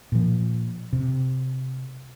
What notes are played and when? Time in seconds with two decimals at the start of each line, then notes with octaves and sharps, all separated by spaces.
0.12 A#2 F3
0.93 C3